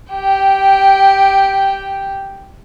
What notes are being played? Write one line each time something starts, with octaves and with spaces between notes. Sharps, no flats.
G4 G5